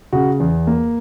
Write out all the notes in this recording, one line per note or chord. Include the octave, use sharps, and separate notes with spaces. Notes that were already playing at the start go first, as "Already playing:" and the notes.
C#3 F#4
E2
A#3